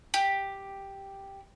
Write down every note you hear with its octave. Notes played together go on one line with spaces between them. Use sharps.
G4